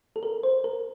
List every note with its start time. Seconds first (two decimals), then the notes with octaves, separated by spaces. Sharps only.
0.16 A4
0.23 A#4
0.43 C5
0.64 A#4